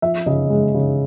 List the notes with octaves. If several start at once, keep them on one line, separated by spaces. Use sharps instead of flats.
F3 E5
C#3 D#5
G#3
C#3